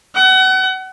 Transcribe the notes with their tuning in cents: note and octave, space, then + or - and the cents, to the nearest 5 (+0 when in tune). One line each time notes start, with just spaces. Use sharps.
F#5 +30